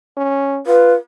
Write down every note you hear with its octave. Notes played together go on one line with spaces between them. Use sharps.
C#4
F4 B4